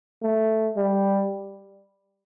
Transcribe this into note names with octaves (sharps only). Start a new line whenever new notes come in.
A3
G3